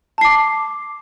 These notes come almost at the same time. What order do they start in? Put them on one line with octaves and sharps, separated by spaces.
A5 C7 D6